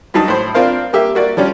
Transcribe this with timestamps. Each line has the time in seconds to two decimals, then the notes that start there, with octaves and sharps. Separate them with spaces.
0.14 G2 F#3 D#4 A5
0.28 A2 C5
0.54 C4 D4 F4 A#4 C5 F5
0.93 A#3 G4 E5
1.15 A#3 F#4 D5
1.37 F3 G3 C#4